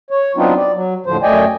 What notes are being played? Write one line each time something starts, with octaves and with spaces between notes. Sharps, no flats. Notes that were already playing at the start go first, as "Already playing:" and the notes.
C#5
F#3 B3 C4 D4 D#4 F4
D5
F#3
D#2 A2 D3 F3 C5
F#2 A3 D5 D#5 G5 G#5